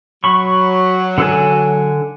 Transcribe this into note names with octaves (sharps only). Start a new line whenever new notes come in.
F#3 B5 C#6
D3 A4 G#5